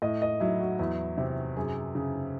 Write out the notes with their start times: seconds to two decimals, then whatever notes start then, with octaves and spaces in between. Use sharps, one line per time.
0.02 A2 D#5
0.22 D#5
0.40 F#3 E4
0.60 F#4
0.79 E2 E4
1.18 C3
1.56 F#2 G#4
1.95 C#3